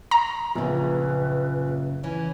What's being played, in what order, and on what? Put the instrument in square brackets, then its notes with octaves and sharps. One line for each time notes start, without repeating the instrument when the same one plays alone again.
[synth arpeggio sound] A#5
[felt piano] A#1 [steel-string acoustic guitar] F#2 C#3 [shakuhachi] B4
[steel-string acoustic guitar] E3 C#4 E4